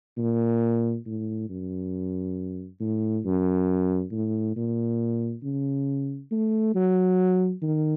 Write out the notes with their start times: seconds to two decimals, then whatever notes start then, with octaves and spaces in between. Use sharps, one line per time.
0.18 A#2
1.06 A2
1.49 F#2
2.80 A2
3.25 F#2
4.12 A2
4.56 A#2
5.43 C#3
6.31 A3
6.75 F#3
7.62 D#3